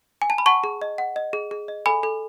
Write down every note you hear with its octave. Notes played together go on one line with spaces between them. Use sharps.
G#5
A5
B5
F#5 A5 C#6
G#4
D#5
F#5
D#5
G#4
G#4
D#5
A4 G#5 B5
A4